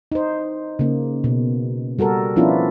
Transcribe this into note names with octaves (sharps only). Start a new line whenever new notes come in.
D#4 C5
C#3 A#3
B2
G3 F#4 A4 A#4
F3 B3 C#4 D4 E4 F4